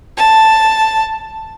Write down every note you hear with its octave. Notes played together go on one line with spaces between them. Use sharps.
A5